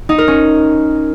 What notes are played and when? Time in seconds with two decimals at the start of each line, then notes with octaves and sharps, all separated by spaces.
0.09 D#4
0.18 A#4
0.28 C#4